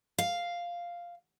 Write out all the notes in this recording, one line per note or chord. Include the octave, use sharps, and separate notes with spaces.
F5